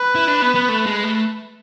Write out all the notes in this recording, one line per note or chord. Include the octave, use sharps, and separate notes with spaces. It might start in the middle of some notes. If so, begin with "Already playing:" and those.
Already playing: B4
E4
D4
B3
B3
A3
G#3
A3